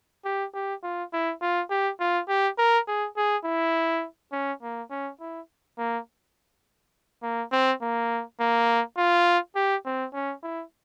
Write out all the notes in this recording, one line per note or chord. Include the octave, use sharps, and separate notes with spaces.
G4
G4
F4
E4
F4
G4
F4
G4
A#4
G#4
G#4
E4
C#4
A#3
C#4
E4
A#3
A#3
C4
A#3
A#3
F4
G4
C4
C#4
E4